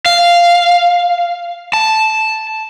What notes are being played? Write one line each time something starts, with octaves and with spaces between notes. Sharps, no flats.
F5
A5